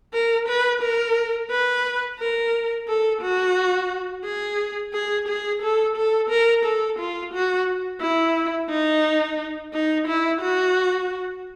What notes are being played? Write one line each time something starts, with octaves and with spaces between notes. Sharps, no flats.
A#4
B4
A#4
B4
A#4
A4
F#4
G#4
G#4
G#4
A4
A4
A#4
A4
F4
F#4
E4
D#4
D#4
E4
F#4